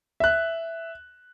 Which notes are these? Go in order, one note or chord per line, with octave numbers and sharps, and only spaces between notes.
E5 F#6